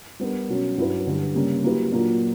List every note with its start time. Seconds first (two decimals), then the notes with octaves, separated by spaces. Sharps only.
0.19 G3 B3 D4 A#4
0.49 B2 F#3 C#4
0.78 G2 F#3 C#4 E4 B4
1.07 G2 D3 G3
1.34 C#3 G3 A#3 C#4 G4
1.64 F#3 A#3 E4 G4 B4
1.92 A#2 F#3 A#3 D4